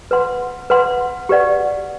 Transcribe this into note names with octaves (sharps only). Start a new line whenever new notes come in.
B4 F#5 C6
B4 F#5 C6
G4 B4 D5 F#5